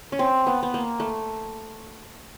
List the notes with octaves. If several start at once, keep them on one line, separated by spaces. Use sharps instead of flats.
C#4
C4
B3
B3
A#3
A3